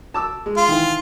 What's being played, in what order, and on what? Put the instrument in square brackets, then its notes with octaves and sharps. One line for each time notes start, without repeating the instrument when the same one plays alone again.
[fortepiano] A5 D6 E6
G#3
[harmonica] F4
[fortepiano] D#3 E3